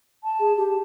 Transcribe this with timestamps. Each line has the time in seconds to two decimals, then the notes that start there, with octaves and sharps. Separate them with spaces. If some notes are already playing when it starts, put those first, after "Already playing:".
0.24 A5
0.40 G#4
0.57 G4